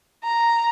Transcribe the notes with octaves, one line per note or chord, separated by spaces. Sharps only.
A#5